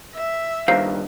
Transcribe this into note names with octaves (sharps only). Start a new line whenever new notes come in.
E5
G2 D#3 C5 F5